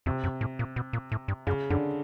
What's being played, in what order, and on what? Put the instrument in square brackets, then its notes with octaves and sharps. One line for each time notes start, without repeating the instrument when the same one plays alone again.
[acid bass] F2 [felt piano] C3
[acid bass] F#2
A2
A#2
B2
A#2
A2
G2
[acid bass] F#2 [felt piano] C#3
[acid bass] F#2 [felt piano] D3